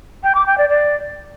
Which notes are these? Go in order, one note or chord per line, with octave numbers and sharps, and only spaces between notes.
G5
D6
G5
D5
D5